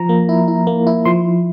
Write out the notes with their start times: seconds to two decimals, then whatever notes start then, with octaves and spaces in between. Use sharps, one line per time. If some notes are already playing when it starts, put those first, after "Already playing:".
Already playing: F3 A#5
0.09 A#3
0.29 E4
0.48 E4
0.67 A#3
0.87 E4
1.05 F3 C6